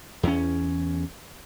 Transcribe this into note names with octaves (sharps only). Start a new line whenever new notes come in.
E2 C#4